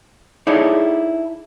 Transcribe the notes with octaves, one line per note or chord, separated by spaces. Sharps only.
D#4 E4 G#4 A4 C#5 D5